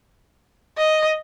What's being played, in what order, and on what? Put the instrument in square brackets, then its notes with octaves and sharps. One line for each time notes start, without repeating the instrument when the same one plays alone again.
[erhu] D#5